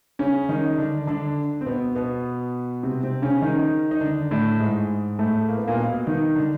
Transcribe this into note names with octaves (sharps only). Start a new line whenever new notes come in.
C#3 C#4
D#3 D#4
D3 D4
D3 D4
C4
B2 B3
B2 B3
C3 C4
C3 C4
C#3 C#4
D#3 D#4
D#4
D3 D4
A2 A3
G#2 G#3
A2 A3
A#3
B3
A#2 A#3
B2 B3
D#3 D#4
D3 D4